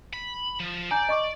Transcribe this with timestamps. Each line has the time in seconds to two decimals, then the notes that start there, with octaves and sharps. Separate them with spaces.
0.13 B5
0.60 F3
0.91 D5 G#5 A#5 G6
1.09 D#5 C#6 D6